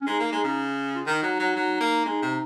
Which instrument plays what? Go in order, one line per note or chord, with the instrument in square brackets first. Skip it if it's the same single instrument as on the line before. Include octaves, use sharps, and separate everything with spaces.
[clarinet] C#4
[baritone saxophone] G#3 [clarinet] D#4
[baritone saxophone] A#3
G#3
C#3
[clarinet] F4
[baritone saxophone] D#3 [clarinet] D#4
[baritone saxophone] F#3
F#3
F#3
A#3
[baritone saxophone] G#3 [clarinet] D#4
[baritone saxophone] C3